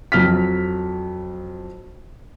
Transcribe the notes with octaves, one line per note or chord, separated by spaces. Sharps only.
F2 F#3 F6 B6